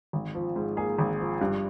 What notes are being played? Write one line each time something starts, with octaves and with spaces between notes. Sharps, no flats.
G#1
F3
G#2
A#3 G#4
G#1
F3
G2